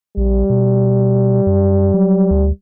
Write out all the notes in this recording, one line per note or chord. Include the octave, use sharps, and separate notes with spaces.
A#1 G3
B2
F#2
F#3
D2